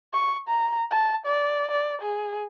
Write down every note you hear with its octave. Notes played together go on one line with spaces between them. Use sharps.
C#6
A#5
A5
D5
D5
G#4